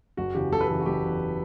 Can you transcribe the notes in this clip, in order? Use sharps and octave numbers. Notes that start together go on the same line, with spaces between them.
F#1 F#4
E2 C#3 E3 G4
F#1 A4
B4
E2 C#3 E3 A4
F#4
F#1 G4
E2 C#3 E3